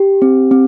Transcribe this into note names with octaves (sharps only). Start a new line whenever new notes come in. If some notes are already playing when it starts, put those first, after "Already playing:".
Already playing: G4
C4
C4